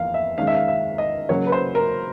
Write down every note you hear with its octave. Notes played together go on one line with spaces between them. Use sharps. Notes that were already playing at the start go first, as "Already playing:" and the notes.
Already playing: E2 F3 A#3 F5
E5
D#3 G#3 C#4 F5
E5
F5
E5
D#5
C#3 F#3 A#3 C#5
B4
C5
A#4